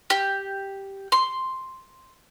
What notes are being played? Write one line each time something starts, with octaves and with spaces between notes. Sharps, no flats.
G4
C6